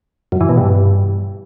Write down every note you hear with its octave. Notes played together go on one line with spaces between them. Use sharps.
F#2
E3
B2
G2